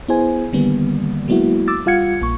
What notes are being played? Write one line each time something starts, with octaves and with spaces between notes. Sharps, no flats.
B3 E4 G#4 C5 G#5
D3 D#3 G3 A#3 B3
F#3 G#3 A#3 B3 E4 F#4
D6 E6 A6
G3 F4 F5 F#5 G#6 C#7
A#1 A#3 C#6